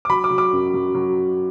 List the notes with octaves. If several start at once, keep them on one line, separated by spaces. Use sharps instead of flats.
D6
F#3 B5
D6
F#3
D6
F#2
F#3
F#3